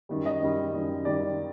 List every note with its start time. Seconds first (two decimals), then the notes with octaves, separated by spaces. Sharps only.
0.09 F#2 D#3 G3
0.26 D#5
0.41 F#2 D#3 G3
0.74 F#2 D#3 G3
1.05 F#2 D#3 G3 D5